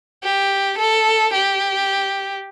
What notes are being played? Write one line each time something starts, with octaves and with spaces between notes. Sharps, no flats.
G4
A4
G4